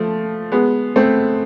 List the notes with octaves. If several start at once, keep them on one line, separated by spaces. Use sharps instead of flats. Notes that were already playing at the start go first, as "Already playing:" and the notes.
Already playing: F3 A3
G#3 B3
A3 C4